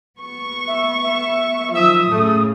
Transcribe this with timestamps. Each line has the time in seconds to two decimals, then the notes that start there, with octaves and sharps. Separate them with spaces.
0.18 B3 C#6
0.68 E5
1.03 E5
1.75 D#3 F3 F#3 E5 D#6
2.12 A2 C#3 A3